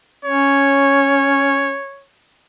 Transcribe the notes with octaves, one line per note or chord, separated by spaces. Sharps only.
C#4 C#5